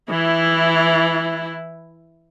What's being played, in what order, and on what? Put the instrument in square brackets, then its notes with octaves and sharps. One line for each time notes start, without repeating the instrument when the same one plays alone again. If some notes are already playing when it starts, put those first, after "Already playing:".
[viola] E3 E4